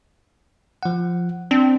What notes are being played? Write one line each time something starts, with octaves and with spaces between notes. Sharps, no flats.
F3 F#5
C4 D4